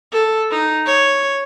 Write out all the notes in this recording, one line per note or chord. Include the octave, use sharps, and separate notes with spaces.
A4
D#4
C#5